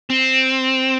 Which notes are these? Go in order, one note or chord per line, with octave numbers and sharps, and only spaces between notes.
C4